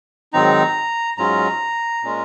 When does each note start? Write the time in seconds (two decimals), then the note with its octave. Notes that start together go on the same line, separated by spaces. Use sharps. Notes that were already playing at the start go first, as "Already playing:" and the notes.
0.33 G#2 D#3 F#3 C4 D#4 A#5
1.18 G#2 F#3 C#4 F4 A#5
2.03 A#2 G#3 C#4 F4